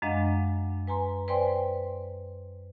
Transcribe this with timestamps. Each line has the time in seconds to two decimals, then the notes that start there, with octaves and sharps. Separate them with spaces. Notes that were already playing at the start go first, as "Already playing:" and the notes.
0.02 F#2 G#3 D4 D#5 F5 F#5
0.87 B4 G#5 A#5 C6
1.28 B4 C5 D5 G5 G#5 C6